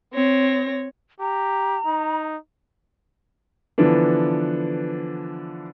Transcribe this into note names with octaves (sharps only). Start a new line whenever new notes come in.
C4 C#5 A#6
G4 A#5
D#4
D3 E3 F3 B3 D4